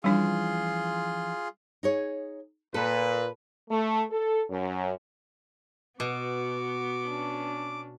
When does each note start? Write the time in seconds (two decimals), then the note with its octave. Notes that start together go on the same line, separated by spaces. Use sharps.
0.04 E3 F3 G3 C#4 D4 F4 G#4 C6
1.83 D#4 G#4 C#5
2.74 A#2 A4 B4
3.69 A3
4.11 A4
4.50 F#2
6.00 B2 B3 F#4 D6
7.06 C#4 D4